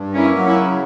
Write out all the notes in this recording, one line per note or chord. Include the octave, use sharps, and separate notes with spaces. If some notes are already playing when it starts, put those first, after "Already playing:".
Already playing: G2
A#3 C#4 E4
F#3
C#4 E4
C#3